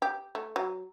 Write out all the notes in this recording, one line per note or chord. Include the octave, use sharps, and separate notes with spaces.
G4
A3
F#3